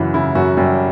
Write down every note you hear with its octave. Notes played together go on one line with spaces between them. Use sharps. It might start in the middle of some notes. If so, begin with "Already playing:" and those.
Already playing: F#2 C#3 E3 F#4
C#3 E4
F#2 F#4
F#2 G3 G4